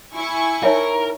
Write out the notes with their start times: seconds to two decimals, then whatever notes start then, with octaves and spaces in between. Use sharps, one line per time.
0.13 E4 G#5 C#6
0.63 D#4 A#4 C#5 E5